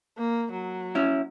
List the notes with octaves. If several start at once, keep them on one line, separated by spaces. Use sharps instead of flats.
A#3
F#3
C#4 E4